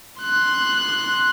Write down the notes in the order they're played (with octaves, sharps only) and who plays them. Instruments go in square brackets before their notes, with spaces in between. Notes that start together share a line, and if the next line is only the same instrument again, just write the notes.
[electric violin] C6 F#6